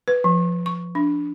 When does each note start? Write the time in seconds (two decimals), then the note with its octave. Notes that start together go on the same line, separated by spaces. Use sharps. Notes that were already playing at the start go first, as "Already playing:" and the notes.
0.08 B4
0.24 F3
0.66 C#6
0.95 D4